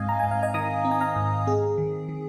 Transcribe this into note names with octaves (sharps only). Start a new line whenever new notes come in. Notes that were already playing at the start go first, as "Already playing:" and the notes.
Already playing: G#2 C4 D#5 F5 G#5
A#5
G#2 G#5
F5
D#5 G#5
D#3 A#5 D#6
C4
G#5
F5 A#5
G#2
C4 G#4
D#3
D#3